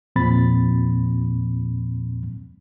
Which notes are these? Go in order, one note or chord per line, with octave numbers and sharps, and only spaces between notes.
E2 A#2 F3 C4 B5 A6